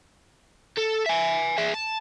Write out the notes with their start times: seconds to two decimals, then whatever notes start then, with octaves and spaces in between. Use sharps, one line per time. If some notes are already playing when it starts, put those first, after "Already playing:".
0.77 A4
1.06 E5 G#5
1.58 G#4 E5
1.74 A5